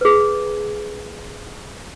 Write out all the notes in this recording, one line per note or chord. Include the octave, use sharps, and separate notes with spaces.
G#4 B4